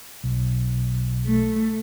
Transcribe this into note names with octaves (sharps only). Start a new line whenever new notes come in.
B1
A3